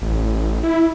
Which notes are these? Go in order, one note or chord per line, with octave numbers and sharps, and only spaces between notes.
A1
E4